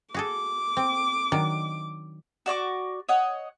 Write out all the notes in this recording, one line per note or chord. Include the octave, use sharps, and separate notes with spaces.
F#4 G#4 A4 D6
C4
D#3 F#3 D4
F#4 D5 C#6 D6
C#5 D#5 F#5